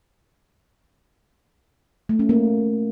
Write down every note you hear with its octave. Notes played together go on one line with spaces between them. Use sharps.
A3
C#4
A#3